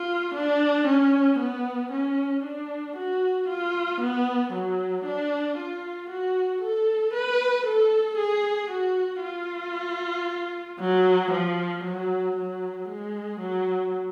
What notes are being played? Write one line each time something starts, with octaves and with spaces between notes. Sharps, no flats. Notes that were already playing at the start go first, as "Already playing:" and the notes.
Already playing: F4
D4
C#4
B3
C#4
D4
F#4
F4
B3
F#3
D4
F4
F#4
A4
B4
A4
G#4
F#4
F4
F#3
F3
F#3
F#3
G#3
F#3